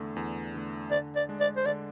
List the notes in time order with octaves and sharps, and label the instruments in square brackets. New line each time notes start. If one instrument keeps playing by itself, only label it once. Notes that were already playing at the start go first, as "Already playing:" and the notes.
Already playing: [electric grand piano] E2 D3 A3
E2
D3 A3
[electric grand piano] D3 [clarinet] D5
[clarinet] D5
[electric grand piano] G#3 D4
[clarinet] D5
C5
[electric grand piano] D3 [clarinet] D5